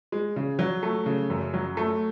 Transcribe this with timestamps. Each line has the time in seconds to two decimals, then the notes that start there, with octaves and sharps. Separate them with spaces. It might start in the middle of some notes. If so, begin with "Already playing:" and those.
0.12 G#3
0.36 C#3
0.59 F#3
0.83 A3
1.06 C#3
1.30 F#2
1.54 F#3
1.77 A3